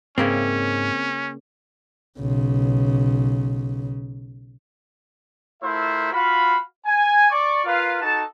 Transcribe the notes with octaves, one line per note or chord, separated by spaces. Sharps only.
G#2 C#3 A#3 C4 C#4 E5
B1 C#3
A3 E4 F4 A#4 C5 E5
F4 F#4 F5 B5
G#5
D5 C#6
F4 A#4 B4 F5
D#4 F#4 A4 A5